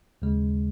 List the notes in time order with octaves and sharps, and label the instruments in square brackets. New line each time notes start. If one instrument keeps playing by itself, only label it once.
[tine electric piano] D#2 C#3 G#3